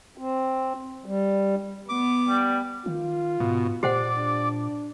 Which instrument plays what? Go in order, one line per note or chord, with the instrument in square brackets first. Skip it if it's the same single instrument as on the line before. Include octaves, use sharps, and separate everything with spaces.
[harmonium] C4
G3
[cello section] B3 [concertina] D6
[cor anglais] G3
[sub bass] D#3 [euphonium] F4
[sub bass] G#2 [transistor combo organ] B2
[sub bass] A#2 [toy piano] G4 C5 F#5 [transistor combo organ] D5
[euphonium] D4